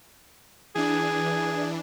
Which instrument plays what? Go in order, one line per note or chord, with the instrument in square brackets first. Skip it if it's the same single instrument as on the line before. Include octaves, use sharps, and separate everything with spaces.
[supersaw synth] E3 D4 [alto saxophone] G#4